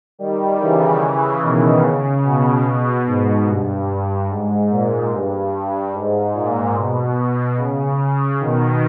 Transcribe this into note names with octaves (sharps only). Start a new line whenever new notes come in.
D#3 G3
C#3 E3
B2 D#3
C#3
B2
G#2
G2
G#2
A#2
G2
G#2
A#2
B2
C#3
B2 D#3